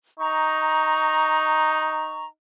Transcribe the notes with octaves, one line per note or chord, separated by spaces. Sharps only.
D#4 A#5 C#6